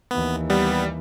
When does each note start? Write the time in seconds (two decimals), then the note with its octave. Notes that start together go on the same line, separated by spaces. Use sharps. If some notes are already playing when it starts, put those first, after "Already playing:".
0.11 D#2 E3 B3
0.50 G3 B3